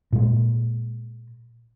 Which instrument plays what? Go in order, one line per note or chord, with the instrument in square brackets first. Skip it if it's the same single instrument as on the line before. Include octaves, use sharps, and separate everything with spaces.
[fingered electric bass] A#2 G#3